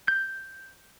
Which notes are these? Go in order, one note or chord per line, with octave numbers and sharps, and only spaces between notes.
G6